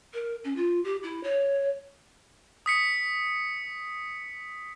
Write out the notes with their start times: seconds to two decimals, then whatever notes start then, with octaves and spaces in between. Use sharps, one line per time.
0.13 A#4
0.44 C#4
0.56 F4
0.84 G4
1.03 E4
1.23 C#5
2.66 D#6 B6 C#7